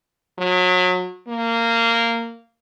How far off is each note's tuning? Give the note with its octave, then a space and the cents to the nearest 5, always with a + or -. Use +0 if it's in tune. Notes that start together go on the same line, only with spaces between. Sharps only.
F#3 -30
A#3 -15